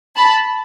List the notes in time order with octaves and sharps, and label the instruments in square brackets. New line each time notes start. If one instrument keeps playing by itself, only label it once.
[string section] A5 B5